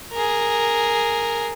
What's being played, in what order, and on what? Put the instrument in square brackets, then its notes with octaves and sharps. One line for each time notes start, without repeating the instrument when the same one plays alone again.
[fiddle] G#4 A#4